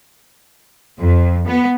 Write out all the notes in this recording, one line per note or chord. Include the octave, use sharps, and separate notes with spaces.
F2
B3